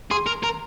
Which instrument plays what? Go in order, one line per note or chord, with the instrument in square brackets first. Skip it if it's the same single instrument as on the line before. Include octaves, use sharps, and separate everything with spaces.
[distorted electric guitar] G#4 [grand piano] C6
[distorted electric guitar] A#4
A#4